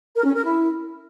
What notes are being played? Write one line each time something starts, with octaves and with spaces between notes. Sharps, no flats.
A#4
C#4
A#4
E4